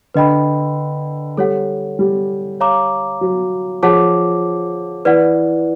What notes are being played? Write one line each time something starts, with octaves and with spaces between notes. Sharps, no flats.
D3 B4 D#5 G5 B5
G3 A4 C#5 F#5
G3
C#5 F5 A#5 D6
F#3
F3 G#4 C#5 F#5 A5 D6
E3 B4 D5 F#5